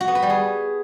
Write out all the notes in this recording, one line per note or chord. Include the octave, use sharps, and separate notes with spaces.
F#4
B3
B4
G3
G#4